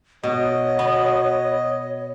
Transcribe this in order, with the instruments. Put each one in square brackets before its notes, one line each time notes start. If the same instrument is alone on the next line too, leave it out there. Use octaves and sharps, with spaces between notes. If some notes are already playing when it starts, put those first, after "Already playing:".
[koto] B2 [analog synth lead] F#4 [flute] C#5 [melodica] D#5
[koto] B3